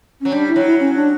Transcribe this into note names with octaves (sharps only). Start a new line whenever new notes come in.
F#3 C#4
G3 D4
E4
F#3
E4
C#4
D4